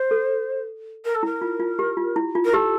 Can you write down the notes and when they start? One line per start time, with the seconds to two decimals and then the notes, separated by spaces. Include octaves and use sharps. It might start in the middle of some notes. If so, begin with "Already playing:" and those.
Already playing: C5
0.11 A4
1.04 A#4
1.14 A4
1.23 E4 A#4
1.42 F4
1.60 F4
1.79 G4
1.97 F4
2.16 E4
2.35 F4
2.44 A#4
2.53 G4 A4